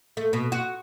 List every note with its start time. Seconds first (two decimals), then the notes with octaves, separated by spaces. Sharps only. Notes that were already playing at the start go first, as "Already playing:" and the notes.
0.17 A3
0.33 B2
0.52 F#4